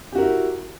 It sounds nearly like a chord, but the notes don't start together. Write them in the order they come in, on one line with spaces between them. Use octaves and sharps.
G4 F#4 A#4 E4